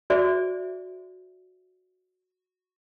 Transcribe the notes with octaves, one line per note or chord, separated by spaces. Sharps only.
F#4 G#4 C5 D5 E5